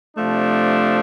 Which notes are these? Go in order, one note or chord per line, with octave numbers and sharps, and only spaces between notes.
C3 F3 A3 D4